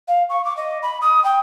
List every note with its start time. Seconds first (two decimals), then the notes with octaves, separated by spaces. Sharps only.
0.08 F5
0.29 C#6
0.45 D6
0.57 D#5
0.82 B5
1.01 D#6
1.24 G5